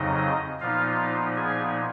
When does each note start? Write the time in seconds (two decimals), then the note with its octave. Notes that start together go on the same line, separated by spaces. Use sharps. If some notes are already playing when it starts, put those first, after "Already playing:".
Already playing: F2 C#3 F#3 D#4 D#5
0.61 A#2 F3 B3 D#4 F4 F5
1.36 G#4 G#5